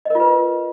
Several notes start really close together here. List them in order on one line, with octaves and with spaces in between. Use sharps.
D#5 A#4 F4 B4